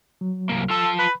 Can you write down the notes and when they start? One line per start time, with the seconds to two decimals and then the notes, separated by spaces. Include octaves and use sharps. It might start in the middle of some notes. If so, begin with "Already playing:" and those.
0.21 F#3
0.49 C2 A#3
0.70 F4 A4 A5
0.99 B4 B5